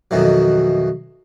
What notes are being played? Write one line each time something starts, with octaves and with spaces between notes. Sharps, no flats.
F2 B2 D#3 E3 F#3